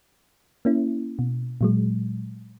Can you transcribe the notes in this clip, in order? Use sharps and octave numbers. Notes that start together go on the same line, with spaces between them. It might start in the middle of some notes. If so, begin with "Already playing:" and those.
A#3 C#4 E4
B2
A#2 F#3 G#3